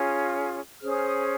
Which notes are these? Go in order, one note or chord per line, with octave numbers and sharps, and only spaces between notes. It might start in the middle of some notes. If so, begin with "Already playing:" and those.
Already playing: C#4 F4 G#4
C#4 G#4 C5 F6
D#6
F6
D#6